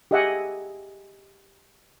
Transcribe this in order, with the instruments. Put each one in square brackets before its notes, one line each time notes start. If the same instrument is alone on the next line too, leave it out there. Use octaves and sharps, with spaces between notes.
[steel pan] G4 G#4 D#5 E5 F#5 G#5